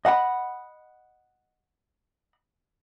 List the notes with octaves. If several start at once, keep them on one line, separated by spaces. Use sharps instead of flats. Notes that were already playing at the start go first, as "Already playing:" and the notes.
D#5 F#5 A5 B5